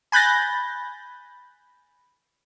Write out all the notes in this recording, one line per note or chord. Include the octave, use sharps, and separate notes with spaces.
G#5 B5 F#6 G6 A6 A#6